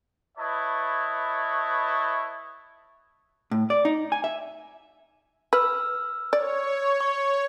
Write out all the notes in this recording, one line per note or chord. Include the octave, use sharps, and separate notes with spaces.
E4 B4 C#5 D#5 A5
A2
D5
D#4
G#5
E5
B4 E6 F6
C#5 D5
C#6